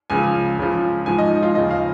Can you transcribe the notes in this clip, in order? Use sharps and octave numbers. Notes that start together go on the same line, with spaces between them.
C#2 C#3 F3 G#5
C#2 C#3 F3
G#2 F3 G#5
D#5
D#4
F4
D#2 C#3 F3 D#5
F5